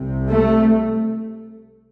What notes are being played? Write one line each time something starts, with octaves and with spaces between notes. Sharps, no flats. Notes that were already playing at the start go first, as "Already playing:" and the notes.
Already playing: C2 C3
A3